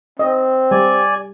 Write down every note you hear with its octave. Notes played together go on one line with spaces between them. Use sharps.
C4 D#5
G3 D5 G#5